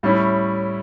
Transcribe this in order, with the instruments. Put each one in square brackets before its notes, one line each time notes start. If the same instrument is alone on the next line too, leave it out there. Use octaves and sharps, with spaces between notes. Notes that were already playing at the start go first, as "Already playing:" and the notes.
[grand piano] A2 G3 C#4 E4